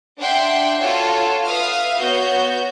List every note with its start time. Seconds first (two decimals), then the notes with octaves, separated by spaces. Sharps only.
0.20 D4 E5 F#5 G5 C6
0.79 F4 F#4 A4 C#5
1.45 B4 E5 F5 D#6 F6
1.99 B3 F#4 C#5 G6